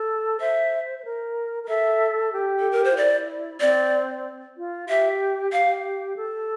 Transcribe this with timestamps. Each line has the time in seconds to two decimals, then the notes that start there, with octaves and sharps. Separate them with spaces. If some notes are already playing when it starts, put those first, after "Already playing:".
Already playing: A4
0.40 C5 E5
0.99 C5
1.05 A#4
1.63 A#4
1.68 A4 E5
2.33 G4
2.60 A4
2.71 A#4
2.84 C5
2.91 F4
2.97 E4 D5
3.61 C4 D5
4.57 F4
4.89 G4 E5
5.52 G4 F5
6.16 A4